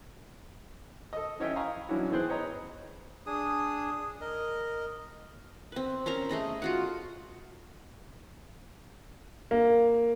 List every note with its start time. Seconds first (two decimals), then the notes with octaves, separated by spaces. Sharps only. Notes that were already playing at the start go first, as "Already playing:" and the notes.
1.13 A4 D#5
1.40 E3 C#4 C#5 D#5 E5 G5
1.56 D#5 F5 G#5 A#5 B5 C#6
1.89 E3 F#3 C#4 D4 E4 F#4
2.10 E3 B3 G#4 C5 G5 F#6
2.29 B4 C#5 D#5 A#5
3.26 D4 G#4 D#6
4.21 A#4 D#5
5.72 C4 B4
6.06 C#4 A#4 C5 A#5
6.29 A3 G#4 D#5 B5
6.62 F4 F#4 F#5
9.51 A#3